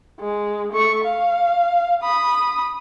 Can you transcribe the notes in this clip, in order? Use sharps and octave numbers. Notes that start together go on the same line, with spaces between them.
G#3
A3 C#6
F5
B5 D#6